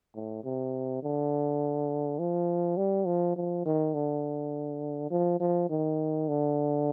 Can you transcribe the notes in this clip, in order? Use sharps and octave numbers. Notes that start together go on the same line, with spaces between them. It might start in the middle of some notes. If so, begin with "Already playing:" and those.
A2
C3
D3
F3
G3
F3
F3
D#3
D3
F3
F3
D#3
D3